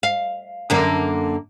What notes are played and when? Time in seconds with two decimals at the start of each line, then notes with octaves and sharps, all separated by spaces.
0.03 F5
0.70 F#2 D3 A#3